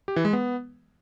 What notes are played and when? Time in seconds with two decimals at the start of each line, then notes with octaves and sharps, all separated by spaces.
0.08 G4
0.16 E3
0.25 G#3
0.33 B3